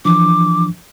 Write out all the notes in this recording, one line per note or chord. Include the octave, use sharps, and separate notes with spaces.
E3 F3 D4 D6